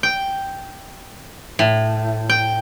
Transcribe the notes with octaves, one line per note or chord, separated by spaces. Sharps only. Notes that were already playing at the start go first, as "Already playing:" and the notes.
G5
A2
G5